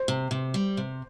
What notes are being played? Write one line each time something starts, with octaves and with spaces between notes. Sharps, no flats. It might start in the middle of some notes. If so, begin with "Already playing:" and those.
Already playing: C5
C3
C3
G3
C3